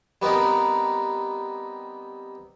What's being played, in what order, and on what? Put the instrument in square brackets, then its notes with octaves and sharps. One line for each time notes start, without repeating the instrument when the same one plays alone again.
[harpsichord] G3 B3 C4 D#4 A#4